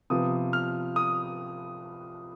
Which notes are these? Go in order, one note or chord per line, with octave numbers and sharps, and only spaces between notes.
C3 F3 B3 D#6
F6
D#6